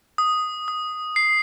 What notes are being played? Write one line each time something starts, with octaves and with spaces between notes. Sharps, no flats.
D#6
D#6
C7